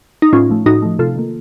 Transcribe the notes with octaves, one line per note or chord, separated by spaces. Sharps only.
D#4
A2 C#4 F4
F3 A3
A2 D#4 F#4
F3 A3
C3 F4 A4
D#3 A#3